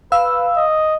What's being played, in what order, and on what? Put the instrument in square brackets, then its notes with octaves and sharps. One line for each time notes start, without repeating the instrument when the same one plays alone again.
[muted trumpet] B4 [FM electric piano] F5 E6
[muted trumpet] D#5